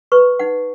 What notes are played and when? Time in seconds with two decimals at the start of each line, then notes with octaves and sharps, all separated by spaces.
0.12 B4 C#6
0.39 D#4 F#5